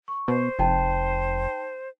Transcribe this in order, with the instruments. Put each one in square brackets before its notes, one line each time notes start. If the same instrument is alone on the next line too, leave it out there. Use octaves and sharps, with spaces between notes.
[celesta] C#6
[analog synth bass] B2 [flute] C5
[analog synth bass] F1 [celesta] D#4 G5 A5